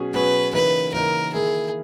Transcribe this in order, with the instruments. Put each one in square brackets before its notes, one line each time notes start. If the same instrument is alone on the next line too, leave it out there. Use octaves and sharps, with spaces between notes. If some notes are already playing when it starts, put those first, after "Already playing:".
Already playing: [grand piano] B2 F#3 C#4 G#4
[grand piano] B2 F#3 C#4 G#4 [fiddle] B4
[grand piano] C#3 E3 A#3 D#4 [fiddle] B4
[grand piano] C#3 E3 A#3 D#4 [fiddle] A#4
[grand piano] D#3 A#3 E4 [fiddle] G#4